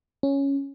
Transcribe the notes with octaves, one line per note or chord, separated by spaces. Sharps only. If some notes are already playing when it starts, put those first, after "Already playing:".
C#4